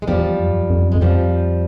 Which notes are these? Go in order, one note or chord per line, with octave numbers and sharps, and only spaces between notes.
G#3
E2 F3 G3
F#2
F2
F#2
F2 G#3
F3 G3